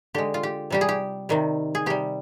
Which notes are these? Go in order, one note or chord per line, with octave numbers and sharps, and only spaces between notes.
D3 G#3 G4
F4
G4
C3 G3 G4
G#4
G4
C3 D#3 G3
G#4
C3 G3 G4